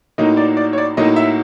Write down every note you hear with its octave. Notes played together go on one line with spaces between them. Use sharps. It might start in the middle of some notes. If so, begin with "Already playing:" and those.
A2 F#3 A#3 D#4 D#5
D5
D5
C#5
D5
A2 F#3 A#3 D#4 D#5
E5